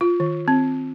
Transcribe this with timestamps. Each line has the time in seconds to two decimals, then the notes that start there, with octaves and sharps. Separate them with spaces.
0.01 F4
0.20 D#3
0.48 C4